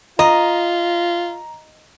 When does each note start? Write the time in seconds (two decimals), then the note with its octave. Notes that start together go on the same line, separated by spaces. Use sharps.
0.19 F4 D#5 A#5